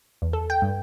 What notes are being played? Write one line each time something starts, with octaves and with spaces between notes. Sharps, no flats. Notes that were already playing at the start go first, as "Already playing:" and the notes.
E2
A4
G5
G2